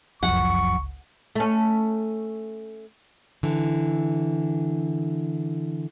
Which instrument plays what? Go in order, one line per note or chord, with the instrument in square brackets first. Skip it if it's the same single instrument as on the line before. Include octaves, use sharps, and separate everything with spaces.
[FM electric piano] G1 C#2 [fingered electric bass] F#2 F3 [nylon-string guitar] F#5 [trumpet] C#6
[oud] A3 C#4
[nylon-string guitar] D3 E3